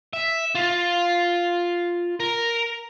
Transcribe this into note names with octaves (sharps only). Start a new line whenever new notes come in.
E5
F4
A#4